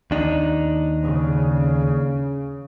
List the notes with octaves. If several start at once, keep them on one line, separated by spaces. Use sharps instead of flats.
D#2 D4 D#4
C#3